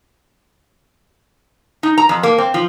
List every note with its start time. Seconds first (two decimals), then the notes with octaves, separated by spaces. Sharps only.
1.83 D#4
1.98 A#5
2.09 F2
2.23 A#3
2.38 C4
2.54 F3